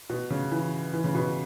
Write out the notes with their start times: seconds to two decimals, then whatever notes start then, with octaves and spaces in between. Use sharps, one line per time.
0.10 B2
0.30 C#3
0.51 E3
0.93 E3
1.04 C#3
1.15 B2